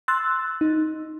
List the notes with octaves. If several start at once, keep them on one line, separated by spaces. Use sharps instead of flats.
C6 E6 F#6 A6
D#4